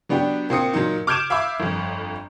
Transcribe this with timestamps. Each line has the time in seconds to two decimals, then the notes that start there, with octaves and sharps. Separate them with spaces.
0.09 F#3 B3 D4 F#4 G4
0.50 A#2 C4 D#6 C#7
0.74 A#2 F#3 D#4
1.07 D6 F6 G6 G#6 D7 E7
1.30 E5 F5 B5 D6
1.60 G1 F2